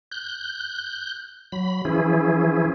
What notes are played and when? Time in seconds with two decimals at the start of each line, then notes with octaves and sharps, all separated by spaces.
0.12 F#6 G6
1.52 F#3 B5
1.85 E3 F3 C#4 E4 G#4